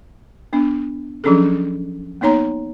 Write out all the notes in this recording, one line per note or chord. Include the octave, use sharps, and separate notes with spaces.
B3 D4
F3 F#3 C#4 D4 G#4 A4
A#3 B3 D#4 C#5 A#5